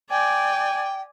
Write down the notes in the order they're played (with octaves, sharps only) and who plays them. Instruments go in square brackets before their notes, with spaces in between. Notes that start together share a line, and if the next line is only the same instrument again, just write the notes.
[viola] D5 G#5 [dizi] G5